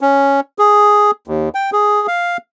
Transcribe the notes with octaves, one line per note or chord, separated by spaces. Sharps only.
C#4
G#4
D#2
G5
G#4
F5